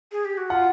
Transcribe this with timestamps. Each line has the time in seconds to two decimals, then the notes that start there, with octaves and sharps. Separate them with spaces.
0.12 G#4
0.25 G4
0.37 F#4
0.50 F4 F#5